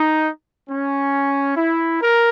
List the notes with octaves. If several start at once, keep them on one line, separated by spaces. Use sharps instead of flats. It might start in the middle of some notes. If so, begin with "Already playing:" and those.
Already playing: D#4
C#4
E4
A#4